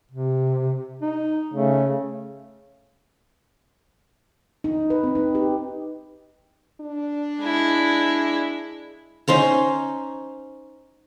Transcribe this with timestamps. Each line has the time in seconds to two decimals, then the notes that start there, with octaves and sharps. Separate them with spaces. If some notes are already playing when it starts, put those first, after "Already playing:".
0.12 C3
1.02 D#4
1.54 C#3 A3
4.64 D#4
4.90 B4
5.03 C4
5.15 D#4
5.35 G4
6.81 D4
7.41 G#3 E4
9.28 C#4 D#4 C5 A#5